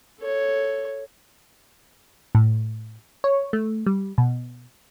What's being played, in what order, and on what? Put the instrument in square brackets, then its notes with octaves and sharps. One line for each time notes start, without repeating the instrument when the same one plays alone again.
[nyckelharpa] A4 C#5
[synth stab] A2
C#5
A3
G3
B2